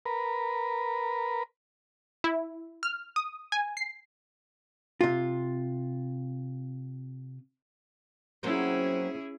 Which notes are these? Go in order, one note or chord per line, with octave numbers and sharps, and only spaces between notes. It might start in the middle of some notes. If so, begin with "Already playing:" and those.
A#4 B4
E4
F6
D#6
G#5
C7
C3 F4
F#3 A#3 C4 C#4 E4 G#4